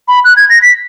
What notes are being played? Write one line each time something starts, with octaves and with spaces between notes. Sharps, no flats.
B5
F#6
G#6
A#6
B6